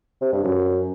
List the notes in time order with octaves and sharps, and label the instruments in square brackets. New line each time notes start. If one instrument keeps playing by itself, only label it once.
[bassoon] C3
G2
F#2